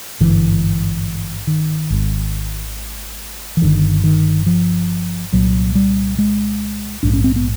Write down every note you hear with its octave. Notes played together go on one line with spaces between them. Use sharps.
G#1 G2 D3 E3
D#3
G#1 G#2
E3
G1 G2 D3 D#3
D#3
F3
C2 A#2 F#3
G3
G#3
A#1 G#2 D4
C#4
C4
B3